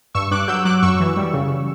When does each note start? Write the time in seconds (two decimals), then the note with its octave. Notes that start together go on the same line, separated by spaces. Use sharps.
0.14 G2 C#6 E6
0.31 G2 D6 F#6
0.48 F#3 E6 G6
0.65 F#3 D6 F#6
0.82 F#2 C#6 E6
1.00 E3
1.17 G3
1.33 C#3